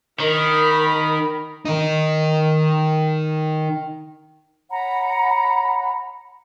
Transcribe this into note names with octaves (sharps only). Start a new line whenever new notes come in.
D#3 A#4 B5
D#3 D#4
C#5 F#5 A#5 B5